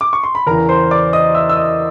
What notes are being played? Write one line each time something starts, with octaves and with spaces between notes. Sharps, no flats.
D6
C#6
C6
B5
E2 C#3 E3 A#4 A#5
C5 C6
D5 D6
D#5 D#6
E5 E6
E6
D#5 D#6